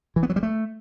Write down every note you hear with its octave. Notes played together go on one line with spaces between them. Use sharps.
E3
B3
F#3
G3
A3